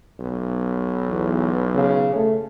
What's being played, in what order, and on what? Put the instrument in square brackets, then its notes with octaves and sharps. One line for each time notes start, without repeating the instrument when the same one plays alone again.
[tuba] B1
[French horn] E2
C#3
A3